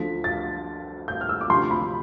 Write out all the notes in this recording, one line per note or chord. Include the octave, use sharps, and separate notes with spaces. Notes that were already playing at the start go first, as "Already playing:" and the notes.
Already playing: D2 D3 F3 B6
A6
G6
F6
E6
D6
D2 C3 F3 C6
B5